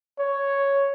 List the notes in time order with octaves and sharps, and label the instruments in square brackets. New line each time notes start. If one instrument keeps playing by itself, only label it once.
[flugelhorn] C#5